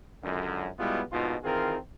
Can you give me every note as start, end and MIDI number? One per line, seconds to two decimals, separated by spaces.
0.23 0.68 37
0.23 0.68 42
0.23 0.68 50
0.79 1.01 47
0.79 1.01 55
0.79 1.01 56
0.79 1.01 59
0.79 1.01 64
0.79 1.01 65
1.12 1.36 34
1.12 1.36 44
1.12 1.36 47
1.12 1.36 63
1.12 1.36 65
1.44 1.77 51
1.44 1.77 52
1.44 1.77 60
1.44 1.77 65
1.44 1.77 68
1.44 1.77 70